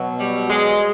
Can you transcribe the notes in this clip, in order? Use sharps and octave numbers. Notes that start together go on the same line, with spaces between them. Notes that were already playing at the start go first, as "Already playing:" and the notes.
Already playing: B2 F#3
G3
G#3